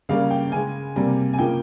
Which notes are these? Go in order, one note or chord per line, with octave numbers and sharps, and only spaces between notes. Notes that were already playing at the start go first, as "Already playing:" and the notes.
C#3 G3 A#3 F5
G5
C#3 G#3 G#5
C3 G3 A#3
G#5
C#3 F3 A#3 G5